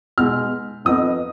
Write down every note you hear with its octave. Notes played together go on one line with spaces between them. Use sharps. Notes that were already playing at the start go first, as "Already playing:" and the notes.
B2 G#3 D#4 F6
F2 F3 B3 D#4 D#6